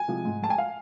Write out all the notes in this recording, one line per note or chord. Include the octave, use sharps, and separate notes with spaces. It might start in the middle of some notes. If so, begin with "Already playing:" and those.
Already playing: G#5
C3 F3 G#3
G#2
G#3 A5
G#5
F5